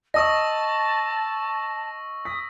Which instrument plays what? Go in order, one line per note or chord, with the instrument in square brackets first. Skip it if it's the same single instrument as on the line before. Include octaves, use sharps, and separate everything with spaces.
[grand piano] D#5 D#6 [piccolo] A5 [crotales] C#6 E6 A#6
[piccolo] D#6 [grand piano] B6